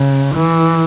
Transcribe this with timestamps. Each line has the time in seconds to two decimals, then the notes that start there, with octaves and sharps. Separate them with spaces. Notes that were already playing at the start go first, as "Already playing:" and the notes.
Already playing: C#3
0.35 E3